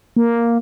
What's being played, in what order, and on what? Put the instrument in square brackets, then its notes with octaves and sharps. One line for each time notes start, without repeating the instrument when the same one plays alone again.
[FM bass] A#3